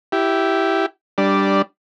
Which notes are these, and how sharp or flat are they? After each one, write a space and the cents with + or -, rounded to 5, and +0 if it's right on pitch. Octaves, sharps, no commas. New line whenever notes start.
E4 +0 G4 -10
G3 +0 D4 +0 D5 -5